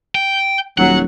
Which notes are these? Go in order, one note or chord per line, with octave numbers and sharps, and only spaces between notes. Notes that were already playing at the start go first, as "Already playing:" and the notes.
G5
D#1 F#3 F#5